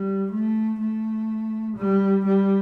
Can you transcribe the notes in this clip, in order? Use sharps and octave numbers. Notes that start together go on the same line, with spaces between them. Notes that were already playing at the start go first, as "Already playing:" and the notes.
Already playing: G3
A3
A3
G3
G3